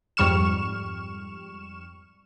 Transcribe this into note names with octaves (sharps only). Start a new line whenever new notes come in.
F2 G#2 G3 C#6 F6 E7